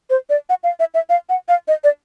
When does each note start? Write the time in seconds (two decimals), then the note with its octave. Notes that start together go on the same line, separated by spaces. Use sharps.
0.10 C5
0.30 D5
0.49 F#5
0.64 F5
0.80 E5
0.94 E5
1.09 F5
1.29 F#5
1.49 F5
1.68 D#5
1.84 D5